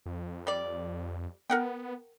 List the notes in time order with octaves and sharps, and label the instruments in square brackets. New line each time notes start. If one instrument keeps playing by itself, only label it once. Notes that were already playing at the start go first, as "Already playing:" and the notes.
[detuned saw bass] F2
[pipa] G3 D5
[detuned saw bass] B3 [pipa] A#4 F#5 G5